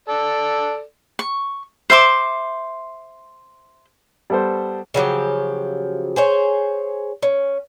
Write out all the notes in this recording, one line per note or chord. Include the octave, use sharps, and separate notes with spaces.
A4 D5
C#6
C5 E5 C6 D6
G3 B3 A4 C5
C#3 F3 F#3 G4
G#4 C5 C#5
C#4